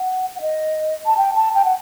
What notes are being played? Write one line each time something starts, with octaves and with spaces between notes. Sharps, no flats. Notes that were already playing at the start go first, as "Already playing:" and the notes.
Already playing: F#5
F#5
D#5
A5
G5
A5
G5
F#5